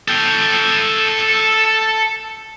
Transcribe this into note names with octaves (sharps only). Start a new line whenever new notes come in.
A4 G5